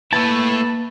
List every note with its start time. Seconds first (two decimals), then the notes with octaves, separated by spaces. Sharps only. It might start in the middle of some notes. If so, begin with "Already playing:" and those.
0.13 A3 A#3 E4 B4 A5